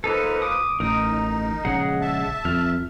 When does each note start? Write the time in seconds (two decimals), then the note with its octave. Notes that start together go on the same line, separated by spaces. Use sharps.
0.04 F3 A#3 D#4 A4 B4
0.42 D6 D#6
0.80 A1 D#4 A#4 D#6
1.65 A#1 C#3 G#3 G#4 F#5
2.01 E5 A5
2.45 F2 F6